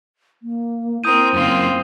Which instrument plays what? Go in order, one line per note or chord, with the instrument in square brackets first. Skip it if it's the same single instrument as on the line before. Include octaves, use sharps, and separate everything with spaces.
[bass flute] A#3
[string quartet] C4 A#4 [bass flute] E4 [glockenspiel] D#6 G6 D#7
[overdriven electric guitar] F#2 A#3 [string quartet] C4 F4